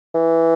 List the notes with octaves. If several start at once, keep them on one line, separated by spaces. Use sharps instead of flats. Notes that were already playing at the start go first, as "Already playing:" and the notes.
E3